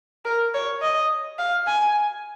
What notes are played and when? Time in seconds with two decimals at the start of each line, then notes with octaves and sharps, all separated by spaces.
0.25 A#4
0.54 C#5
0.82 D#5
1.39 F5
1.67 G#5